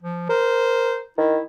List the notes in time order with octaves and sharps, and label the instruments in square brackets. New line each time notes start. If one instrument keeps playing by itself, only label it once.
[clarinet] F3
[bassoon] A#4 [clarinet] C5
[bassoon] D#3 [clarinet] E4